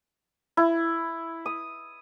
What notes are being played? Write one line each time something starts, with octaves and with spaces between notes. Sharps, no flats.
E4
D#6